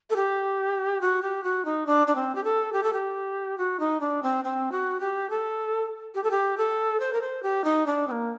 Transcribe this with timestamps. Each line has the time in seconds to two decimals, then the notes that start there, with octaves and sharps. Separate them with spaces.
0.10 A4
0.16 G4
1.01 F#4
1.22 G4
1.43 F#4
1.65 D#4
1.86 D4
2.07 D4
2.15 C4
2.35 G4
2.44 A4
2.73 G4
2.83 A4
2.93 G4
3.58 F#4
3.79 D#4
4.00 D4
4.23 C4
4.44 C4
4.72 F#4
5.00 G4
5.30 A4
6.15 G4
6.24 A4
6.31 G4
6.57 A4
7.00 C5
7.13 A#4
7.21 C5
7.43 G4
7.64 D#4
7.86 D4
8.07 C4
8.11 A#3